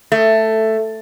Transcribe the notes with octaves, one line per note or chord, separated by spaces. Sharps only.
A3